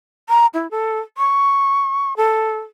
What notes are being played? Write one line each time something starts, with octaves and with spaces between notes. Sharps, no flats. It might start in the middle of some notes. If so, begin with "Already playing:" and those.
A#5
E4
A4
C#6
A4